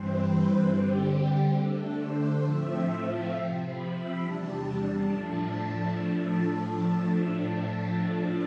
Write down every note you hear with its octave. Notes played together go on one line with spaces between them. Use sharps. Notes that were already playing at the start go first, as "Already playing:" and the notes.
Already playing: G2 E3 G3 C4 C5
B4
D3 G3 C4 G4
D3 A3 D4 A4
C5
A2 F3 A3 C4 E5
F5
C3 F3 C4
B5
E5
E2 C3 G3 D4 A5
A2 F3 A3 D4